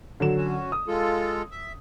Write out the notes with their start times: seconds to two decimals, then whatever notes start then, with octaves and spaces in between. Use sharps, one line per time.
0.20 D3 F#3 E7
0.37 C#4 F#4
0.72 D#6
0.87 G#3 F4 A4
1.51 E5